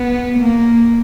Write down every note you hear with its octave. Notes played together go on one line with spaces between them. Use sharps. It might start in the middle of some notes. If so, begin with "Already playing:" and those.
Already playing: B3
A#3